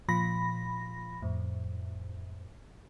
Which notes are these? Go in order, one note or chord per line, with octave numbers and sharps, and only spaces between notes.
A#2 F3 B5 A#6
F2 A2